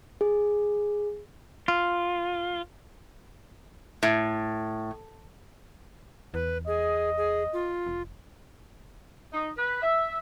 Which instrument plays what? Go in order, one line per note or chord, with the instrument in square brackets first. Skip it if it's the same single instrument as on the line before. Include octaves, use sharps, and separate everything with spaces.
[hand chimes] G#4
[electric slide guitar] F4
[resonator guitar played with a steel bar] A2
[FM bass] E2 [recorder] B4
[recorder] G#4 [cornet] D#5
[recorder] G#4
F4
[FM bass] F1
[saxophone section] D#4
B4
E5